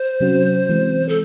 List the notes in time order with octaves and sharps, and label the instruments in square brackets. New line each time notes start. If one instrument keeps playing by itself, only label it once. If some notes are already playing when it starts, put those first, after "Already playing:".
Already playing: [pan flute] C5
[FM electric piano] C3 F#3 C#4 F#4
E3 G#3 C4
[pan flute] A4